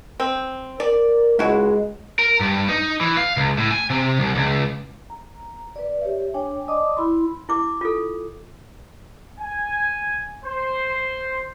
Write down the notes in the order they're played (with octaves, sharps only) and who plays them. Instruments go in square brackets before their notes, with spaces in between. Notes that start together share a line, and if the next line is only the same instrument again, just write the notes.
[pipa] C4
[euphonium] A#4 [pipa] D5
[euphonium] C#2 [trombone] G#3 [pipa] E4 F#4
[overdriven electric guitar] A#4
G2
D#4
E3
F5
C#2
A2
G#5
C3
C2
C#2
[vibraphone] A#5
B4 D5
G4 C#5 E5
D4 C#5 G5 G#5
D5 D#5 A5 D6 D#6
E4 B5 C6
[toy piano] E4 D6
F4 A4
[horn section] G#5
C5